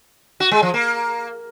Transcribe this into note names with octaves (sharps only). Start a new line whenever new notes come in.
F#4
G#3
F3
A#3